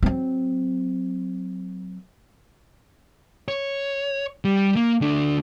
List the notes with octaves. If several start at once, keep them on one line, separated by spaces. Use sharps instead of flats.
F#3 C4
C#5
G3
A#3
D2 D4